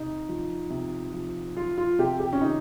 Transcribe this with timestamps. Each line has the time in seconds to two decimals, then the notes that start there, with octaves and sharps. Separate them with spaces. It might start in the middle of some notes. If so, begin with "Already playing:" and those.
Already playing: C3 D#4
0.29 F3
0.70 C3
1.13 F3
1.56 F3 F4
1.78 F4
1.99 C3 G4
2.20 G4
2.33 C#4
2.41 D#3 D#4